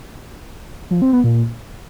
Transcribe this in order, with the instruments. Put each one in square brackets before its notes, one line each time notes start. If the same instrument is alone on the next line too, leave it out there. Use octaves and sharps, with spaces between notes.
[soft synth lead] F3
C4
B3
A#2